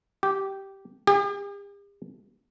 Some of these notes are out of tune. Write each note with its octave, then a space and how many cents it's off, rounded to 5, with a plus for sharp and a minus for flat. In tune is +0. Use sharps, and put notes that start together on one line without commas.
G4 -10
G4 +45